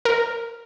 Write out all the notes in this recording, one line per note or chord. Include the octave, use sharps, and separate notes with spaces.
A#4